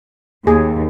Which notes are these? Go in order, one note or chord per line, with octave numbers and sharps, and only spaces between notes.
D#2 G#4